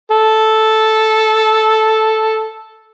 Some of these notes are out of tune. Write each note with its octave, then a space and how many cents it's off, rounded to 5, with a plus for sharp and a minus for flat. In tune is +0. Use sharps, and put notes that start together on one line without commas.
A4 -5